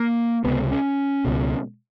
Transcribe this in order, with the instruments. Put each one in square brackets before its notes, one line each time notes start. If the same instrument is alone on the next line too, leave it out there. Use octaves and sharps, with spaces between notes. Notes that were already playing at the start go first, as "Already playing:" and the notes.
Already playing: [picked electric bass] A#3
C#2 C3 B3
C#4
C#2 B2